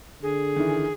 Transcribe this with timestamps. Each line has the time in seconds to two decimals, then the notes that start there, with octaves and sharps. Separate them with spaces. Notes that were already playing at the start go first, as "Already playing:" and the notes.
0.23 D3 G#4
0.56 D#3 E3